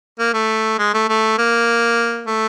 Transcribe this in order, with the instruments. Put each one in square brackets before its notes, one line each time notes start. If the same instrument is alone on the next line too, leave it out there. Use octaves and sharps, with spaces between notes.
[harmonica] A#3
A3
G#3
A3
A3
A#3
A3